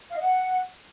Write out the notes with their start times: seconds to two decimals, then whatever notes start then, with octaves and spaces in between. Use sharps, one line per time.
0.10 F5
0.15 D#5
0.21 F#5